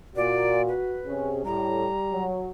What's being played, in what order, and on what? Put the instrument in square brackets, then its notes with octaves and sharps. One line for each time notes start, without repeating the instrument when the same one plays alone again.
[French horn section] A#2 [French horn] F#4 [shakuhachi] D5
[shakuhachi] B4
[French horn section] C3 C#4 G#4
[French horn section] A2 [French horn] G3 [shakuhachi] A#5
[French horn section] F#3